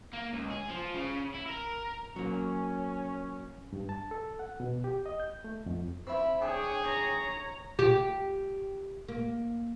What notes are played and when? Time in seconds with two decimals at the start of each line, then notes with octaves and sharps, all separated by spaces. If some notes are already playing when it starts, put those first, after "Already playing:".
0.13 A#3
0.33 C#2
0.51 G#4
0.70 F3
0.95 C#3
1.34 E4
1.48 A#4
2.16 F#3 A#3 C#4
3.73 G2
3.89 A5
4.11 A4
4.39 F#5
4.60 B2
4.84 G4
5.06 D#5
5.20 G6
5.44 A3
5.66 F2
6.07 C4 E4 B5
6.42 D4 G#4 C#5 G5
6.82 C#5 A#5
7.79 G4
9.08 A#3